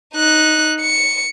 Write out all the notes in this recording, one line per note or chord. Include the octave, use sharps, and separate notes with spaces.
D#4 F#6
C#7